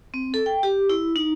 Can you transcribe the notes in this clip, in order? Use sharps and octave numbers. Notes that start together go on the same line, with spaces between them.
C4
A4
G5
G4
E4
D#4